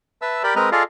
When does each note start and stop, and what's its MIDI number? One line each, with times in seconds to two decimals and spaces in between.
0.22 0.43 71
0.22 0.43 76
0.22 0.43 81
0.22 0.43 88
0.44 0.55 67
0.44 0.55 70
0.44 0.55 74
0.44 0.55 79
0.44 0.55 83
0.56 0.70 56
0.56 0.70 60
0.56 0.70 70
0.56 0.70 71
0.56 0.70 75
0.56 0.70 82
0.72 0.83 65
0.72 0.83 68
0.72 0.83 69
0.72 0.83 74
0.72 0.83 75
0.72 0.83 77